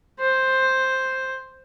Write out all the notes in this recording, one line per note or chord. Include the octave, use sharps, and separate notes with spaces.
C5